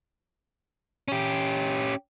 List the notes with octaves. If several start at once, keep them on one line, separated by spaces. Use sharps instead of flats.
C#4 G4